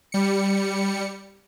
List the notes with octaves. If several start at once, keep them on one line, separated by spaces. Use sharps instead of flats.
G3 C#7